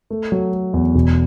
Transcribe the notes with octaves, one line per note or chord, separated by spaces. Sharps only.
A3
F#3
A3
E2
E1